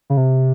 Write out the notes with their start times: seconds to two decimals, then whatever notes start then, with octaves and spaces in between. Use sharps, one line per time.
0.10 C#3
0.17 C3